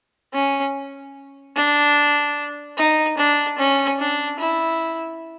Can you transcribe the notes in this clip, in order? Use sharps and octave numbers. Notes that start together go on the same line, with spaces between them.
C#4
D4
D#4
D4
C#4
D4
E4